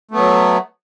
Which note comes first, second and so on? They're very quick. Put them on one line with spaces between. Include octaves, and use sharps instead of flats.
A3 B3 F#3